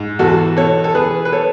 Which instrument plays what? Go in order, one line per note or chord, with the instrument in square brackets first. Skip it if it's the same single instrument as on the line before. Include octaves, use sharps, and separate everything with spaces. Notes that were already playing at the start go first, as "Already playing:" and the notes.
Already playing: [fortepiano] G#2
E2 F#4 A4
B2 A4 C#5
A4
E2 G#4 B4
B4
A4 C#5